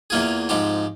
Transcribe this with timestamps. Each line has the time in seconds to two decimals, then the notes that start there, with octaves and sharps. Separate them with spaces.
0.10 E2 E3 A#3 F4 G#4
0.49 G#2 F3 C4 G4